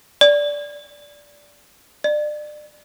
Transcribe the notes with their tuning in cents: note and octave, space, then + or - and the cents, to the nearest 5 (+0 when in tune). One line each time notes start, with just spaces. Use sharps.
D5 -10
D5 +30